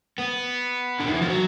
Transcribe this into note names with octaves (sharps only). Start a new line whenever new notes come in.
B3
D3
D#3
E3
F3
F#3